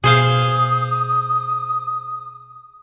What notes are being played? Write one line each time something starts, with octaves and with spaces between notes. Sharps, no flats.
B2 G#4 C5 F5 D#6